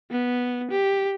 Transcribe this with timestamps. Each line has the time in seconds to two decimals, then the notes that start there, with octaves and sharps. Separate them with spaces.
0.11 B3
0.71 G4